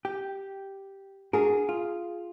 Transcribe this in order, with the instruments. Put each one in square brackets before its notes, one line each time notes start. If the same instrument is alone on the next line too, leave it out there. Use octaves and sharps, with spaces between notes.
[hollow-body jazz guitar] G4
[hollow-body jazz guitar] D4 F#4 A#4 [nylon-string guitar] G#4
[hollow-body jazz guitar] F4